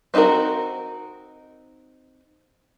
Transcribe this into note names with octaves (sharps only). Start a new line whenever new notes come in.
C4 D#4 F4 F#4 A#4